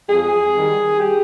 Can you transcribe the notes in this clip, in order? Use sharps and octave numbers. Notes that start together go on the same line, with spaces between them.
F2 G#4
D#3 G3
G4